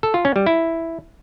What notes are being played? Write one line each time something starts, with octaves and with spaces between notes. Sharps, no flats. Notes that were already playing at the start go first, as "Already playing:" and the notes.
A4
F4
C#4
G3
E4